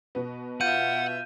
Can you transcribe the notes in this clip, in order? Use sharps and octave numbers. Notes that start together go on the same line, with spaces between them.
B2 B3
F4 E5 F#5 G6 D#7